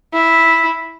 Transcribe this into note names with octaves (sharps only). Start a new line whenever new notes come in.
E4